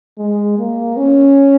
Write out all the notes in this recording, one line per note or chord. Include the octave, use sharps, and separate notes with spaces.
G#3
A#3
C#4